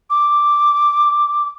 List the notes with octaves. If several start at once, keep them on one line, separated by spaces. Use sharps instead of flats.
D6